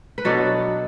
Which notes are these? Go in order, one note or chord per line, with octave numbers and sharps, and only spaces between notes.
B4
B2 F#3 B3 D4 A4